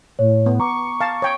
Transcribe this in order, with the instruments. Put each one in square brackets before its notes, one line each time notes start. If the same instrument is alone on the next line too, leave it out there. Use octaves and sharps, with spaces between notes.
[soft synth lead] A2 [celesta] C#5
[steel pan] B3
[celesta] A#5 D6 [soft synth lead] C#6
[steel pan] F5 A5
C#5 G5